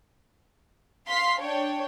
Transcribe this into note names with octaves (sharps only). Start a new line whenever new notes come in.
F5 C6 B6
D4 C#5 G5